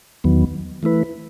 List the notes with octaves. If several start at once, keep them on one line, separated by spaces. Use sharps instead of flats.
E2 D#3 F#3 B3
E3 A3 E4 B4